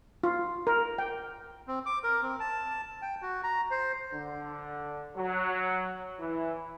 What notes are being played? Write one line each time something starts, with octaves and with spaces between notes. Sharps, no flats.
F4
A#4
G5
C4
D6
A#4
C4
A5
G5
F#4
A#5
C5
D3
F#3
E3